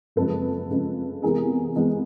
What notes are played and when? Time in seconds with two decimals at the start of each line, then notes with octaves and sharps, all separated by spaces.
0.16 F#1 F2 C#3 F3 G#3 A4 B4
0.70 F#1 F2 C#3 F3 G#3
1.22 E2 C3 E3 G#3 B3 G#4 A#4
1.76 E2 C3 E3 G#3 B3